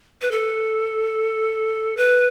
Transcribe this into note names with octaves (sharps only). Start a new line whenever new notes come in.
B4
A4
B4